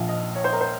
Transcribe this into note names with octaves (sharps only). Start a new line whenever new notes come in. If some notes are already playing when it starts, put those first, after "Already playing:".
Already playing: A#1 A#2 F3 F5
D#5
C#5
C5
A#4
C5